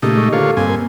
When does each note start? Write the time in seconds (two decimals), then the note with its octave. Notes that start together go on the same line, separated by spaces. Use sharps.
0.02 A#2 C#3 A3 D#4 G4
0.17 G#3 C#6
0.33 D3 F4 A4 A#4 C#5 F5
0.57 G2 A#3 C4 G#5
0.70 A#4